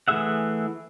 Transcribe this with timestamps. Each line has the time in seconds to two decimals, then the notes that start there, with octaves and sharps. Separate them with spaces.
0.08 E3 A3 G#4 E5 F#5